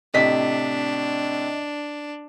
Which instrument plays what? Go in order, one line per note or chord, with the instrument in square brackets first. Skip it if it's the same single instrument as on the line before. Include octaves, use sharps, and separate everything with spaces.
[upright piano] A2 C3 [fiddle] D4 [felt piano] D#5 B6